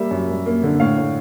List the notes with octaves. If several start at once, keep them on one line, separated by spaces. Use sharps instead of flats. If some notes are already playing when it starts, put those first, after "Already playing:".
Already playing: G3 A#3 E5
F#2
G3
A#3
D3
A2 F5
A2